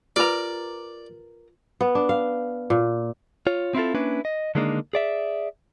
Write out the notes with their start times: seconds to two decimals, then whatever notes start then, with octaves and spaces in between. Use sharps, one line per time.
0.16 F4 G4 A#4 B4 D5 A#5
1.81 B3
1.95 D4
2.09 F5
2.70 A#2
3.47 F4 C#5
3.75 C4 E4 F4 A4
3.95 A#3 C#4 D4 E4 B4
4.25 D#5
4.55 D3 D#3 G#3 A#3 D4 D#4
4.93 G#4 D5 E5